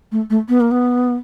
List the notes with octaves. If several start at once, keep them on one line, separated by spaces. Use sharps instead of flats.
A3
A3
B3
A#3
B3